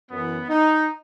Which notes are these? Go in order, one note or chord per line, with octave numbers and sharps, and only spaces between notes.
F#2 E3 B3
D#4